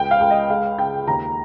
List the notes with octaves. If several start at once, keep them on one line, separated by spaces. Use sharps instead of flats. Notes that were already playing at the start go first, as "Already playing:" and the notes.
Already playing: C#2 G5
F5
C#2
D#5
G#3 F5
C#3 G5
D#2 A#5